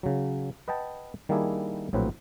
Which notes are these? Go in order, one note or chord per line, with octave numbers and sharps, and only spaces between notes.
C#3 F#3
B4 D#5 F#5 G5 A5
D#3 G3 A#3 D4 E4 G#4
A#1 A2 F#3 C4 B4